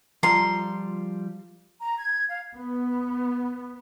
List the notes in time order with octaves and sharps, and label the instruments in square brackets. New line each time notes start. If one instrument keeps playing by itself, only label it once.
[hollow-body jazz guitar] F3 G3 A4 [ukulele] F4 A#5 [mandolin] C6
[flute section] A#5
G#6
F5
[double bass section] B3